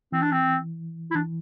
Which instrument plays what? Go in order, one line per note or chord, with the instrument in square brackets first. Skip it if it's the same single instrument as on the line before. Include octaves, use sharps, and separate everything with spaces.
[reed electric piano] E3 [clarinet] C4
[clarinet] D4
C4
E4
[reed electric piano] E3 [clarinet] D4